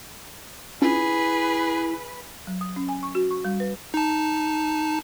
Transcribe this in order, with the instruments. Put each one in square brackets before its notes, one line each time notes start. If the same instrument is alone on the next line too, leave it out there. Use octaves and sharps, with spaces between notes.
[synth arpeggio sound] C#4 D4 F4 [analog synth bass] E4 [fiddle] G#4 [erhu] B4
[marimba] F#3
D#6
C#4
G#5
C#6
F#4
C#6
G3
B4
[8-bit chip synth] D#4 A5